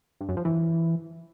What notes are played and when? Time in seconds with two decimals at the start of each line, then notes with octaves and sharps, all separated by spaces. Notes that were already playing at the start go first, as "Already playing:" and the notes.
0.21 G2
0.29 F#2
0.37 F3
0.45 E3